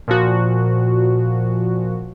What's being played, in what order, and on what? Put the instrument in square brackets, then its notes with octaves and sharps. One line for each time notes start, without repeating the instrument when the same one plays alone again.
[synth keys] A#2 F3 F#4